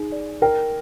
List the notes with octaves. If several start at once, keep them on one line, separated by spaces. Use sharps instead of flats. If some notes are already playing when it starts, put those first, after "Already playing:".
Already playing: D#4 G#4
D5
A#4 G5